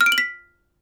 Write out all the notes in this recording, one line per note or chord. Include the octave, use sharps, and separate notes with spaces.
F6
D7
F#7
B6